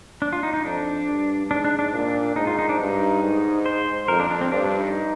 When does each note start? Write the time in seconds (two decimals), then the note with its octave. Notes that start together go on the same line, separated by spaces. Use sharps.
0.22 D4
0.33 F4
0.43 D#4
0.53 D#4
0.65 F2 D4
1.07 G2
1.50 G#2 D4
1.64 D4
1.79 D4
1.93 A#2 D4
2.36 G#2 D#4
2.47 F4
2.59 D#4
2.69 D4
2.80 G2 D#4
3.23 G#2
3.66 C5
4.08 F2 A#4
4.20 D4
4.30 D4
4.41 C4
4.52 G2 D4
4.65 D4
4.80 D#4